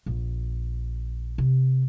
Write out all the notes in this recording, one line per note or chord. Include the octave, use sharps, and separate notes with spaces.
A#1
C3